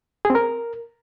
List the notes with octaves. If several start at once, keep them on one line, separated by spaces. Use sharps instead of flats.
G#4
C4
A#4